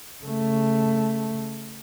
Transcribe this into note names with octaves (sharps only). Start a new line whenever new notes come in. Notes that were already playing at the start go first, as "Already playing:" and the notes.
C#3 A3